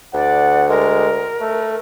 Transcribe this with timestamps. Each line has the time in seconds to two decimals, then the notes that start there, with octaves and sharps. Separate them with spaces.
0.14 D2 D5 F#5
0.69 G#3 A#4
1.41 A3